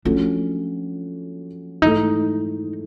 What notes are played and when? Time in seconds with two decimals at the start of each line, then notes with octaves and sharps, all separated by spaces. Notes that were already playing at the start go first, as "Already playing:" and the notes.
0.05 F3 A3 C#4 D4 F#4
1.82 G#2 E3 A3 D#4